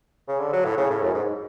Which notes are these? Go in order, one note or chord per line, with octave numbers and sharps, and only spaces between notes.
C#3
D3
F#3
A2
C#3
A2
F#2
G#2